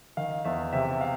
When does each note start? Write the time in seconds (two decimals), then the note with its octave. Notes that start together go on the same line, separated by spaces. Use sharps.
0.17 D#3 F5
0.45 E2 E5
0.73 C3 E5
1.01 F5